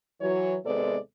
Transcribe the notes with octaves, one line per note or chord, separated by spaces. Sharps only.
E3 F#3 C#5
D#2 C3 G#3 B3 A4 D5